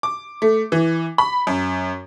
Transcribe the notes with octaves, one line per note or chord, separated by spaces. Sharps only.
D6
A3
E3
B5
F#2